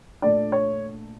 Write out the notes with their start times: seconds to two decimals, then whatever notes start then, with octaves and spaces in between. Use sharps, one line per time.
0.22 A#1 A#2 A3 D4 D5
0.52 C#5